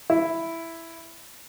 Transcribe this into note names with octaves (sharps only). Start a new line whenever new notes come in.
E4